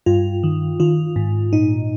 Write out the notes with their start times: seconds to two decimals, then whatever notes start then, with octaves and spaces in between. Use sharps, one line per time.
0.06 G2 F4
0.43 D#3
0.80 D#3 F4
1.16 G#2
1.53 A#2 D#4